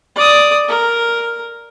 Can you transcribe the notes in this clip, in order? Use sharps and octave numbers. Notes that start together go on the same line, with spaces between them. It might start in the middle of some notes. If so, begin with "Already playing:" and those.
D5 D#6
A#4